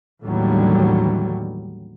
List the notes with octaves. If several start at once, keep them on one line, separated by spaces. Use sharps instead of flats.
D#2 A2 D3 E3 F#3 G3